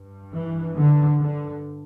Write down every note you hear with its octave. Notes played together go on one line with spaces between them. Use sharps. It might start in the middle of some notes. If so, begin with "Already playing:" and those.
Already playing: G2
E3
D3
D3